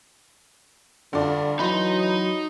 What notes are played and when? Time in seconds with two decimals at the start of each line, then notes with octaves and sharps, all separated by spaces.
1.13 G2 D3 F4 D5
1.59 E3 F#3 D#4 D#5 B5 C6